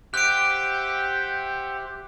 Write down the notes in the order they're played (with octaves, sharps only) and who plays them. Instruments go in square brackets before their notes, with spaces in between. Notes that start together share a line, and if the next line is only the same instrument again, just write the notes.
[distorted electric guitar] G4 [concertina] C5 E5 F#5 [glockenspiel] F#6 D7